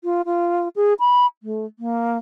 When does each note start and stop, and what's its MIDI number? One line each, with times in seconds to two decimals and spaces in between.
0.04 0.22 65
0.26 0.68 65
0.76 0.94 68
1.00 1.26 83
1.43 1.65 57
1.79 2.17 58